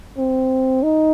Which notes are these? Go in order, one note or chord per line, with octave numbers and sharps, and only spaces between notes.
C4
D#4